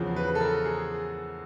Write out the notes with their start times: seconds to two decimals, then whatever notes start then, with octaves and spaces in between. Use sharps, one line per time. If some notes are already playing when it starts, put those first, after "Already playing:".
Already playing: E2 C#3 F3
0.16 B4
0.35 A4
0.41 A#4
0.65 G#4